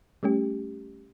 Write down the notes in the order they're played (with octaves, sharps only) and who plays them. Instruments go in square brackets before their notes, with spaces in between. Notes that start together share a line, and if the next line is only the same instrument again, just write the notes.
[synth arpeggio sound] G3 A3 C#4 G4